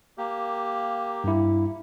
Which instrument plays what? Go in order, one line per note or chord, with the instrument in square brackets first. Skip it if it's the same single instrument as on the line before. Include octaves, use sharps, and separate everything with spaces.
[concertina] A#3 G4
[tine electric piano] G2 E4